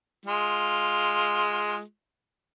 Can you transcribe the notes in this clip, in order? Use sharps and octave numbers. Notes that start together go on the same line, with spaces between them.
G#3 F4